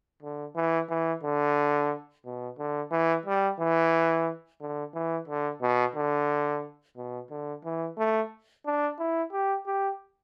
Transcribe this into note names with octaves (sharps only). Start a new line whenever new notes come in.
D3
E3
E3
D3
B2
D3
E3
G3
E3
D3
E3
D3
B2
D3
B2
D3
E3
A3
D4
E4
G4
G4